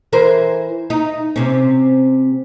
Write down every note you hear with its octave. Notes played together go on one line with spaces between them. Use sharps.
E3 A#4 C5
D#4
C3 C#4